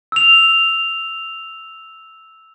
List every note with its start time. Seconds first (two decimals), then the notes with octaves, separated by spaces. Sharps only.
0.12 E6 F7